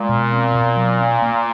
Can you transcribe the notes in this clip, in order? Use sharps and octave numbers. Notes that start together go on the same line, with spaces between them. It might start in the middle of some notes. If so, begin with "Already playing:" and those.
Already playing: A#2 G#3
B2
C4
B2
F#3
C#4
A#3